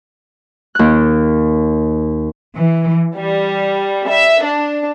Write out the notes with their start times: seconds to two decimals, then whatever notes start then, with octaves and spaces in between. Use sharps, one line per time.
0.75 D#2 F#6
2.56 E3
3.15 G3
4.07 E5
4.42 D4